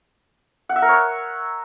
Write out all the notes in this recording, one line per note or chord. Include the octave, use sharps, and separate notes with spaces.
F#5
E5
A#4
C#5